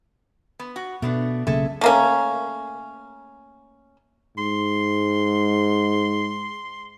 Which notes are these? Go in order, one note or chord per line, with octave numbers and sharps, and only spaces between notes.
B3
F#4
B2 A3 B3 D4
B1 C#3 A#3 G#4 A4 E5
A3 A#3 C#4
G#2 C6